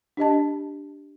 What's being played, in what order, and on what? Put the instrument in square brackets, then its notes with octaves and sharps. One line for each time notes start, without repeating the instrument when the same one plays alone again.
[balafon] D4 G4 D#5 A5